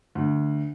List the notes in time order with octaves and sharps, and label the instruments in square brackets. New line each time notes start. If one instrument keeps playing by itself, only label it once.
[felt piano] D2